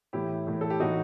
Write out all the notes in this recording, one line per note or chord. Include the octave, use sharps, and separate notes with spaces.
A2 E3 E4 G4
A2 E3
A4
G4
A2 E3 D#4 F#4